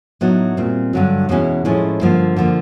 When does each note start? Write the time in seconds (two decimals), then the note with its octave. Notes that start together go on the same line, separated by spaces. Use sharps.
0.21 A2 F#3 B3 D#4
0.57 A#2 G3 C4
0.93 G2 D3 F#3
1.29 E2 B2 G#3 C#4 E4
1.65 A2 F3 G#3 C#4 E4
2.01 G2 D3 F3 A#3
2.36 D3 F3 A#3